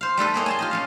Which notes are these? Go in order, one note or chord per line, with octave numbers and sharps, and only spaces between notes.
C5 F5
G3 A3 A4 B4
A#3 G#4 C#5 D#5
G#5 A5 C6
F4 G4 D#5
A3 C#4 F5